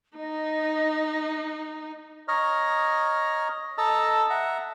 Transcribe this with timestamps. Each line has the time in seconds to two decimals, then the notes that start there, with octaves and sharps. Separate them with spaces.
0.17 D#4 D#5
2.28 C#5 D#5 A#5 F6
3.78 A4 D#5 A5 A#5 E6
4.30 E5 F#5 A#5